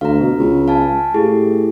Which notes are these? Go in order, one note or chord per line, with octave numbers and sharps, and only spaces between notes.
D2 F5 A#5
B2
C#2
F5 G#5 A5
A2 G4 G#4